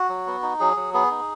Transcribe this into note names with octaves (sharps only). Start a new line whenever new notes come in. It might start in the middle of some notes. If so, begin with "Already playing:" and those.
Already playing: F#4
F#3
B3
D#4
F#3 G#4
F#3
B3 G#4
D#4